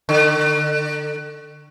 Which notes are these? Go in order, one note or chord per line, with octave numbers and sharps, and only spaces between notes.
D3